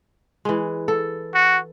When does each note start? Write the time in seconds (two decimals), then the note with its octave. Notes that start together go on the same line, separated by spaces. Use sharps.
0.45 E3 G#3
0.88 A4
1.35 F#4